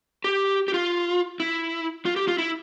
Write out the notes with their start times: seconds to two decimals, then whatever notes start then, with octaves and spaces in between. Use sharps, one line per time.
0.24 G4
0.68 G4
0.74 F4
1.40 E4
2.06 F4
2.16 G4
2.28 F4
2.38 E4